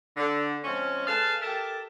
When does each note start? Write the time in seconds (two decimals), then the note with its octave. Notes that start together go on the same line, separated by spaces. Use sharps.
0.17 D3
0.64 F3 G#3 C4 C#4
1.07 G#3 A4 B4 F5 A5
1.42 G4 A4 A#4 E5 A5